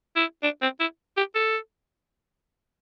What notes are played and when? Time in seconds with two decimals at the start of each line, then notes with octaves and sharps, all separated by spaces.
0.16 E4
0.43 D4
0.62 C4
0.80 E4
1.17 G4
1.35 A4